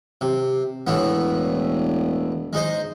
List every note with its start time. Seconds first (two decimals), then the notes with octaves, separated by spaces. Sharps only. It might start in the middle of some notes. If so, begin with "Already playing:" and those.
0.21 C3
0.87 E1 A2 E3 B3
2.53 G#3 D#4 C5